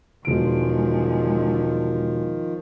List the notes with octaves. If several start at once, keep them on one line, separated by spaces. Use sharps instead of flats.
E1 D3 D#3 F3 G#3 D7